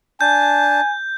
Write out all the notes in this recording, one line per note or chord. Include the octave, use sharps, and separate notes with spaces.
D4 G#5 A5 G6